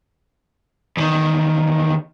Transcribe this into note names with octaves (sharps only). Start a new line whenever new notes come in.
E2 D#3